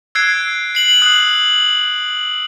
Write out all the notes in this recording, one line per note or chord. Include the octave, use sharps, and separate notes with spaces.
E6 F#6 G#6 C7 D7
C7 F#7
D#6 F#6